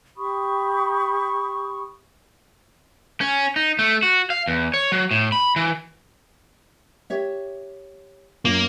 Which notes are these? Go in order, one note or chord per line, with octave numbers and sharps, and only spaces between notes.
G4 B5 C#6 D#6
C#4
D#4
A3
F#4
F5
E2
C#5
F#3
A2
B5
E3
G4 C#5 E5
F#2 A#3 F4